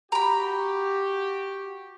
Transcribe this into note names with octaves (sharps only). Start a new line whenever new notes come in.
F#4 G4 A#5 B5